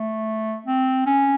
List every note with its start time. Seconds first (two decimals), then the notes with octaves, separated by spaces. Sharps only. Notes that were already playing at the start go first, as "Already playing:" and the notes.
Already playing: A3
0.66 C4
1.06 C#4